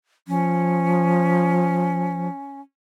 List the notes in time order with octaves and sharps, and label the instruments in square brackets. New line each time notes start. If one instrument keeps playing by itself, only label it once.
[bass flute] F3 [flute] C#4